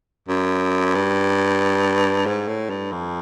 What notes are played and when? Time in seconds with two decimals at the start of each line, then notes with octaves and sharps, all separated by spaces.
0.28 F#2
0.95 G2
2.26 G#2
2.48 A2
2.70 G2
2.92 F2